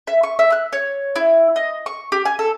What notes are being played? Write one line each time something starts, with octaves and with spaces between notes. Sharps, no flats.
E5
C#6
E5
F#6
C#5
E4
D#5
C#6
G4
G#5
A4